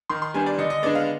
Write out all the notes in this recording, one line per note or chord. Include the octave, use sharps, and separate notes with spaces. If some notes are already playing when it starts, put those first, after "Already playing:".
D#3 C6
C6
G3 B3 D4 G#5
D5
D3 D#5
D#5
G#3 B3 D4 D5
F5